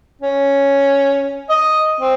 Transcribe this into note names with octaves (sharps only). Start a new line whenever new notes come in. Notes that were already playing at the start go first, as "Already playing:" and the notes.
C#4
D#5
C4